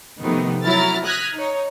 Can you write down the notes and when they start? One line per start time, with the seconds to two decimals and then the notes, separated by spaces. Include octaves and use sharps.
0.21 C3 D#3 F3 A3 B3
0.64 F#3 E4 A#5 F6 A6
1.05 D#6 F6 F#6 G#6 A#6 B6
1.35 D#4 C#5